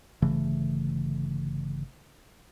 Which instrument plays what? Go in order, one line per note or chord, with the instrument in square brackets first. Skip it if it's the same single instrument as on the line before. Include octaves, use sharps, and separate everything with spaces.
[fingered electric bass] G1 C#3 E3 A3